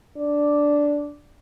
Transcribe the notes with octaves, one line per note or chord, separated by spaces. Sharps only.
D4